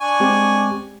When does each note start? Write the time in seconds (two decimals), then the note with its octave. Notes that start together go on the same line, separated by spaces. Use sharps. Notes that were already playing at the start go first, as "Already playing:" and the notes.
0.01 D4 G#5 C#6
0.20 G#3 C4 G4